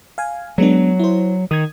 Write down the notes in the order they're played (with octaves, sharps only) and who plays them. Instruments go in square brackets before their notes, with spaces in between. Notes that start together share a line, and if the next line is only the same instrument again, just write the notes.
[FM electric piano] F5 G#5
[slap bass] F#3 [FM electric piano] G#3 B3 D4
[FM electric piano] E4 C5
[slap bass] D#3 [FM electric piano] D#6 G#6